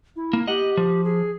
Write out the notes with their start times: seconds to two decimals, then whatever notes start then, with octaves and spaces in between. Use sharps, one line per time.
0.16 E4
0.33 A#3
0.47 G4 D#5 F#5
0.77 F3
1.04 G#4